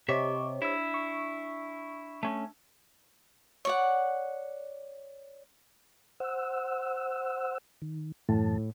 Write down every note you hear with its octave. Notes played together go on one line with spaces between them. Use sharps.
C3 G4 C5 C#5 D#5 E5 C#6 D6
D4 E4 E6
C#6
A3 C#4
C#5 D5 F#5
C5 F#5 E6
D#3
F#2 A2 E3 A5